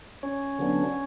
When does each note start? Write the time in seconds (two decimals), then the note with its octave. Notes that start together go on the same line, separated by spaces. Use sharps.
0.23 C#4 C#5
0.59 D3 F#3 B3 D4